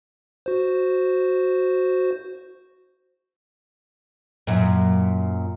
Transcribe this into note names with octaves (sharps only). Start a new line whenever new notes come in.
F#4 C5
F#2 A#2